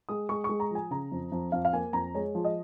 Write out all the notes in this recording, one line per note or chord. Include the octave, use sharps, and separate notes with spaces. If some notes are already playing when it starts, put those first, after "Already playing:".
G#3 D#6
G#3 C#6
G#3 C#6
A#5
F3 G#5
C#3 A#5
F2
F2
F2 F5
F5
A#3 G#5
F2 A#5
G#3 C#5
F3
D#5